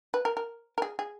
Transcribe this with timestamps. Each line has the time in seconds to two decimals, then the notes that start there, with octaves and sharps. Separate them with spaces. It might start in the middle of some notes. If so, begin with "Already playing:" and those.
0.14 B4
0.25 A#4
0.37 A#4
0.78 A#4
0.82 G#4
0.99 G#4